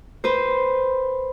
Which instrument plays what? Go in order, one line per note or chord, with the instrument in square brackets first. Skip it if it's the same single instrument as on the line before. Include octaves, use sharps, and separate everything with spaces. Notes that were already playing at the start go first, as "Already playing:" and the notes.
[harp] B4 C5